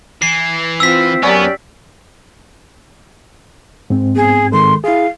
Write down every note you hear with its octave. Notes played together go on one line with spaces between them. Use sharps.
E3 C7
C4 F4 E6 B6
F#2 B3 C#4 G4 D5
G#2 C4
B3 G#4
D#3 G#3 A4 C6
E4 G#4 F5